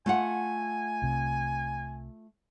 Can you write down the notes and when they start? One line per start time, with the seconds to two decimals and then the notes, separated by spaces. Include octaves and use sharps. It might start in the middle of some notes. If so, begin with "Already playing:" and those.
0.06 A3 F4 F#5 G#5
1.02 C2 C3